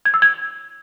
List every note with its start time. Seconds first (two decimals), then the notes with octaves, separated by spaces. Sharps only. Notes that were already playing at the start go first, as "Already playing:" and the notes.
0.05 G#6
0.14 E6
0.22 G#6